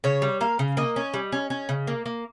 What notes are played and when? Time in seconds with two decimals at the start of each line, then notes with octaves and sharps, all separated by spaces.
0.04 C#3 C#5
0.22 G3
0.41 A#3 F5
0.59 C#3
0.77 A#3 D#5
0.96 C#4
1.14 G3
1.32 C#4
1.50 C#4
1.69 C#3
1.87 A#3
2.06 A#3